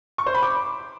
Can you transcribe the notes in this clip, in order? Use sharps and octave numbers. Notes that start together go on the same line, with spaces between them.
C#6
C5
B5
D6